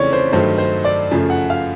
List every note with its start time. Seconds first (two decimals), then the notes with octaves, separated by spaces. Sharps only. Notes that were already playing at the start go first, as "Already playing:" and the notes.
Already playing: F2 C#3 E3 A3 C#5 D5
0.13 C5
0.32 G2 D#3 F#3 A3 C5
0.58 C5
0.85 D5
1.11 F#2 C#3 F3 A3
1.30 F#5
1.50 F5